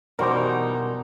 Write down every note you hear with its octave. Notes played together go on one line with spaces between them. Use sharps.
B2 E3 G3 D#4 F#4 A#4 C5 D6